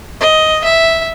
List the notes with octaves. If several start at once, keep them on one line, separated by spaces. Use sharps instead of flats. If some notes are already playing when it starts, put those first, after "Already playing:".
D#5
E5